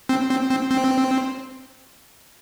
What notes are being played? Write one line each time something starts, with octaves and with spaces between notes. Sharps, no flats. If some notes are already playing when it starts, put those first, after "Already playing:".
C4
C4
C4
C4